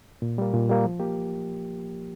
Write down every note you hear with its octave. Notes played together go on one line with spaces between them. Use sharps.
A#2
G3 A#3
A#2
G3 A#3
F3
A#3 G4